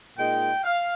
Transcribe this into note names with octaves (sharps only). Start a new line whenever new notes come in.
A#2 G#3 D#4 G5
F5